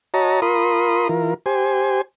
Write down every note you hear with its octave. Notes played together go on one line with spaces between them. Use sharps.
F#4 C#5 D#5 A5 A#5
F4 A#4 B5 C6 D#6
E3 F4 A#4
G4 C5 G#5